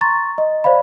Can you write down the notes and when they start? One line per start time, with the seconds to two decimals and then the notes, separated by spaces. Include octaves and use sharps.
0.01 A#5 C6 C#6 A6
0.38 D#5
0.64 C5 D5 F5 B5